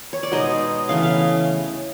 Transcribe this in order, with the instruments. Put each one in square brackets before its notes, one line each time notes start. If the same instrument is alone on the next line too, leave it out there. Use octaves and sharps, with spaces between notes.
[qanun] C#5
D5
B2 G#3 B3 D#4 D#5
C#3 E3 A3 F5
F5